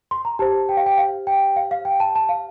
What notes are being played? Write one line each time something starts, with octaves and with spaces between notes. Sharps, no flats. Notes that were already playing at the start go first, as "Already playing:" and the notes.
C6
A#5
G4 C5 A5
G5
F5
G5
F5
G5
F5
F5
G5
A5
A5
F5